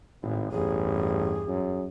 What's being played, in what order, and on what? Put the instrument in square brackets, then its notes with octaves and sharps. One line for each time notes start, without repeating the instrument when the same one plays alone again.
[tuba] G#1 [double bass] A2 G#3
[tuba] A1 [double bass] E2 G2 [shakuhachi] G#4
[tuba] F#2